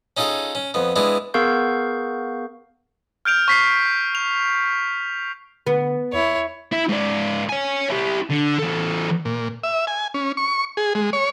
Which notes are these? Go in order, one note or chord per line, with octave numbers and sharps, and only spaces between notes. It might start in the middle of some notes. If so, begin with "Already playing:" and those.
C#4 D#4 F4 G#4 A4
C#4
F2 B3
G#3 B3 D4 E4
B3 G#4 A#4 F5 C#6 G6
F6 G6 D7 F7
C#6 B6 C7
F7
D3 B3
E2 E4 C#5
E4
G#2 D5
C#5 G#5
E4 G4
D3
E2 A4
A#2
E5
G#5
C#4
C#6
G#4
G#3
C#5